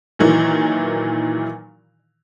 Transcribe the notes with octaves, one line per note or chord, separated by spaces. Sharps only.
A#2 D#3 E3 F#3